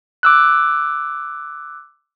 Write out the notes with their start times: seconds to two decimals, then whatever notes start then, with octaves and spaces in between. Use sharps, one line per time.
0.23 D6 E6 F#6